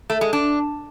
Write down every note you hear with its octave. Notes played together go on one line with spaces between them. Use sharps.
A3
G#3
D4